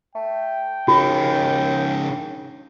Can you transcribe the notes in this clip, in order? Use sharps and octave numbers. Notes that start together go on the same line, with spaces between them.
A3 G5
D#2 C#3 D#4 F#4